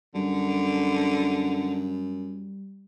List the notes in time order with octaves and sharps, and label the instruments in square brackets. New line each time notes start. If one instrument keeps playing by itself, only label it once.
[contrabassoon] F#2 [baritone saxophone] D3 [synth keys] G3